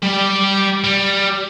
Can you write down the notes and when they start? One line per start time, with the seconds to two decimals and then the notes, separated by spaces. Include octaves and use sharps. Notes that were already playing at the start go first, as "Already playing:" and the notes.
0.03 G3 D5
0.84 G3